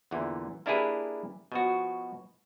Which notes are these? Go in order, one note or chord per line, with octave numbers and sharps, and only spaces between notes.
E2 A#2 D3 E3
A#3 D4 E4 G4 G#4 B4
B2 F3 F#4